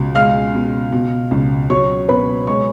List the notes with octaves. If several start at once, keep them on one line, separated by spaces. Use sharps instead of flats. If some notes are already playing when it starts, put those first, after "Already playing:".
Already playing: C#2 B2
G#3 F5 F6
B2
B2
C#2
F#3 C#5 C#6
B2 B4 B5
G#3 C#5 C#6